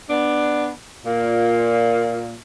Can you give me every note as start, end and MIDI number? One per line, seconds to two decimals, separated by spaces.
0.09 0.67 59
0.09 0.67 62
1.05 2.35 46